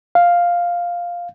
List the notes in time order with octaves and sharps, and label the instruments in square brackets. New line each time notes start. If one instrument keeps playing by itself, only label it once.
[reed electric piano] F5